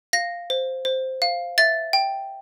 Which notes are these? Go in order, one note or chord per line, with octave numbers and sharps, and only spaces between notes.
F5 A#6
C5
C5
F5
E5 A6
G5